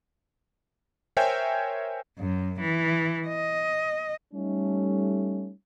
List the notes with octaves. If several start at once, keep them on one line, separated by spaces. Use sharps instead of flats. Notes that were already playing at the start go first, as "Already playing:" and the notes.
A#4 C5 C#5 E5 G5 G#5
F#2
E3
D#5
G3 A3 C#4 D#4